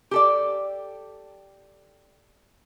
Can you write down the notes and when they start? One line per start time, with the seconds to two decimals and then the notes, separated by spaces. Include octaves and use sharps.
0.11 G4 A4 D5